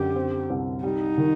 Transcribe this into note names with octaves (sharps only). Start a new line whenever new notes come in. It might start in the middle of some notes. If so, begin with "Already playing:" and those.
Already playing: F#2 D3 G4
C4
C2
G3 D#4
D#3